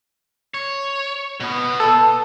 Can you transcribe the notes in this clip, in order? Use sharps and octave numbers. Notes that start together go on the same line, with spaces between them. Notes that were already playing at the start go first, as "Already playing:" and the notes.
C#5
B2 B3
A4